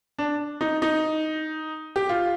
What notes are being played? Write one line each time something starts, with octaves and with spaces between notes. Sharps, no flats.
D4
D#4
D#4
G4
F4